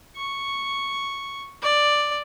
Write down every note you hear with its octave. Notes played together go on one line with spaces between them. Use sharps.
C#6
D5